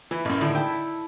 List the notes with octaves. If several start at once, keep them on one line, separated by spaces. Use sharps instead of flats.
E3 E4
A1 F#2
A2 D3 D#3 G#3
E4 A4 G5